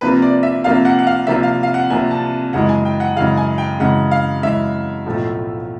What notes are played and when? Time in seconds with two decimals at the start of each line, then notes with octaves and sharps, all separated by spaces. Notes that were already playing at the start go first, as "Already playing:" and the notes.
0.01 C2 C3 F3 A#3 B4
0.22 D5
0.43 E5
0.64 C2 C3 F3 A#3 F5
0.85 F#5
0.99 F#5
1.07 F5
1.27 C2 C3 F3 A#3 E5
1.43 F5
1.63 F5
1.74 F#5
1.90 C2 C3 F3 A#3 G#5
2.11 A5
2.53 F#2 C#3 E3 G#3 F#5
2.69 G#5
2.85 G5
3.00 F#5
3.16 F#2 C#3 E3 G#3 F5
3.37 G#5
3.58 G5
3.79 F#2 C#3 E3 G#3 F#5
4.11 F5
4.42 F#2 C#3 E3 G#3 E5
5.06 B1 A2 F3 A3